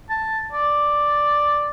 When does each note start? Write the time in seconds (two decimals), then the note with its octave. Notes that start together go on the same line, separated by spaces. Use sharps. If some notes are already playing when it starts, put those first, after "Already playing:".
0.10 A5
0.52 D5